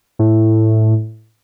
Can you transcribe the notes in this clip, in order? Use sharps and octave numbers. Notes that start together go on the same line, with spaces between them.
A2